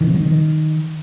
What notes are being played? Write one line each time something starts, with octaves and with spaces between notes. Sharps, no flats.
D#3
C3
F#3
D#3